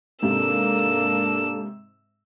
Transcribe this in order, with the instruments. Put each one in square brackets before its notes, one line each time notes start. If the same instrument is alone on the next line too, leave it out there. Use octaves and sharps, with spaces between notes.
[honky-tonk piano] G#2 C3 [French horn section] A#3 D4 A4 [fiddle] E6